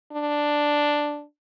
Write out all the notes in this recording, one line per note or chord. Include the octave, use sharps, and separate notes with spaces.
D4